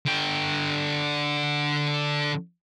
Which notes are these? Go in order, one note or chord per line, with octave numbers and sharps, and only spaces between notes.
D3 G5